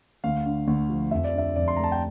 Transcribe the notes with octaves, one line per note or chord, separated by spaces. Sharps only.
D2 F5
D3
D2
F3
F2 E5
D5
D3 E5
F2 D5
C6
A3 A#5
A5
G5